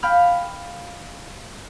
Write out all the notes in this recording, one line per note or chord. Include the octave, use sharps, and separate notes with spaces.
F5 G5 B5 F6